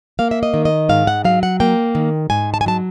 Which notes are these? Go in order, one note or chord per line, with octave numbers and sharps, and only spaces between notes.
A#3 F5
E5
D#5
D#3
D#5
G#2 F5
F#5
F#3 F5
F#5
A#3 G5
D#3
G#2 G#5
A5
G#5
F#3 A5